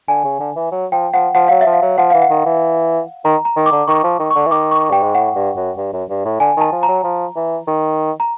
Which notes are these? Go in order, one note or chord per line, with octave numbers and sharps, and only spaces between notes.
D3 G#5
C#3
D3
E3
F#3
F3 G5
F3 F#5
F3 F#5
F#3 F5
E5
F3
F5
F#3
F3 F#5
E3 F5
F#5
D#3
E3
D#3 A#5
A#5
D#3
D6
D3
D#3 C#6
F3
D#3
C#6
D3
E3
D#3 D6
C#6
G2 G5
G#2
A2 F#5
G2
F#2
G2
F#2
G2
A2
D3 G#5
D#3 A5
F3
A#5
F#3
F3
E3
D#3
A#5